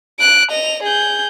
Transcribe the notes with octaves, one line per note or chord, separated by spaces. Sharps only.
F#6 D7
D#5 F7
G#4 G6